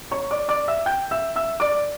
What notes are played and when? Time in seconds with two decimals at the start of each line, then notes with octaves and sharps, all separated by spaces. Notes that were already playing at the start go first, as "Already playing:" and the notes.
0.11 C#5 C#6
0.31 D5 D6
0.48 D5 D6
0.68 E5 E6
0.86 G5 G6
1.11 E5 E6
1.36 E5 E6
1.60 D5 D6